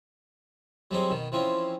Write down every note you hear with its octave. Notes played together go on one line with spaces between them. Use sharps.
F#3 G3 C4 D#4 G#4
B2 D#3
E3 F3 C4 C#4